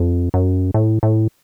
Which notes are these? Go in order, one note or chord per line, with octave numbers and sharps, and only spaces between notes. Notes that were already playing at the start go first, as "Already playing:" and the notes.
Already playing: F2
F#2
A2
A2